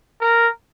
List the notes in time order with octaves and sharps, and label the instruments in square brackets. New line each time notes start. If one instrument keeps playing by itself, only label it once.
[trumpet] A#4